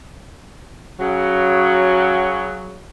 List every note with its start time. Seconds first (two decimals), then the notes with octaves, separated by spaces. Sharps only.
1.00 C#3 F#3